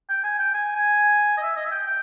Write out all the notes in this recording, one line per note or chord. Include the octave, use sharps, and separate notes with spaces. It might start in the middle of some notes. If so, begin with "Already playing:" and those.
G5
G#5
G5
G#5
G#5
D#5
E5
D#5
E5
G5
G5